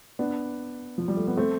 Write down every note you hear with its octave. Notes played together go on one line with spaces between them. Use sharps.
B3 D4
F3
G3
A3
B3
A3 C4